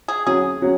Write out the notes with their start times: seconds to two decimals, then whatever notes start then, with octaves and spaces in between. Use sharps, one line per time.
0.08 G#4
0.26 F#3 C#4 F#4 G#4
0.62 F#3 C#4 F#4